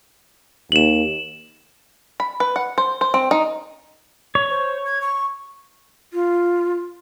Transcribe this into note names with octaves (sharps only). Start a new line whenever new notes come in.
D#2 E7 F#7
B5
B4
F#5
C5
C5
C4
D#4
C#5
C5
G#6
C#6
F4